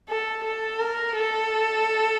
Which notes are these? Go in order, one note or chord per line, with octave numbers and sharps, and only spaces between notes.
A4
A4
A#4
A4